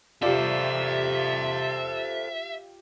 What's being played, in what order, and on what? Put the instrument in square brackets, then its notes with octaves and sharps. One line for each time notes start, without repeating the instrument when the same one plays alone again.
[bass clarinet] C3 [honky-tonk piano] F4 G4 D5 [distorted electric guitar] A4 C5 [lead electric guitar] E5